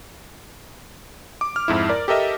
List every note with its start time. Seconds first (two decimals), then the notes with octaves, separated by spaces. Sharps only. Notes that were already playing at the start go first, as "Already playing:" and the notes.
1.41 D6
1.56 F6
1.68 F2 G#2 E4
1.89 A#4 D5
2.08 G4 A4 A#4 D#5 E5